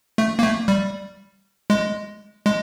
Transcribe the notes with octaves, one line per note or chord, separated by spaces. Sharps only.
A3
A#3
A3
G3
G#3
G#3